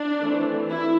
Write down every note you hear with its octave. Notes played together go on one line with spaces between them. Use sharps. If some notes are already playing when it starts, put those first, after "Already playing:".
Already playing: D4
E3 A3 C4
E4